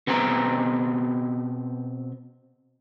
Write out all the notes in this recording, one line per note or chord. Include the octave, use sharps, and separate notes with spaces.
B2 B3 C4 G#4 A4 A#5